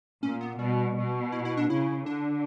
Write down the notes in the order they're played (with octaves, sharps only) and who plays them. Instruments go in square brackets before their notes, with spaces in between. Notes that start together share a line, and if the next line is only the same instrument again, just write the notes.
[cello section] A#2 [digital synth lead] C#4
[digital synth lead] B3
[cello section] B2 [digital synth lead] G3
[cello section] B2
[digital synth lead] E4
E4
D4
[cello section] C#3 [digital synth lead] E4
[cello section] D3 [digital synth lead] D4